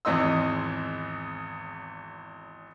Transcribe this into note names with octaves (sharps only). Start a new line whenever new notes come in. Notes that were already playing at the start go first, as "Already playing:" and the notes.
G#1 E2 C4 D#5 C6 E6